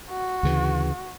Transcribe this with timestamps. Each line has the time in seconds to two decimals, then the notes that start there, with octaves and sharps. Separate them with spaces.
0.10 F#4
0.43 D2 C#3 E3